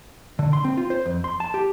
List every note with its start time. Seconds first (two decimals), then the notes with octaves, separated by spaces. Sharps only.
0.39 D3
0.53 C6
0.65 C4
0.77 F4
0.90 C5
1.05 F2
1.24 C6
1.40 A5
1.54 G4